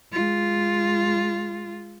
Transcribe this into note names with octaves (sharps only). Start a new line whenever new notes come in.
G#3 F4